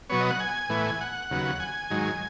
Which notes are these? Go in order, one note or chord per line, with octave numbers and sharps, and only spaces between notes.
B2 F#3 B3 C#5
D#5
F#5
G#5
A2 E3 B3
F#5
D#2 C#3 F#3 B3
G#5
G#2 D#3 F#3